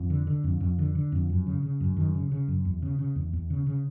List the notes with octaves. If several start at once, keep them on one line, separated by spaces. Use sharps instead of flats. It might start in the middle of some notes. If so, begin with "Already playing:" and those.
Already playing: F2
D3
D3
F2
F2
D3
D3
F2
F#2
C#3
C#3
F#2
F#2 D#3
C#3
C#3
F#2
E2
C#3
C#3
E2
E2
C#3
C#3